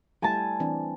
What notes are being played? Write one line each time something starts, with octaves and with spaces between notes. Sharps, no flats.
G3 A3 E4 G#5 A5
E3 C4 D4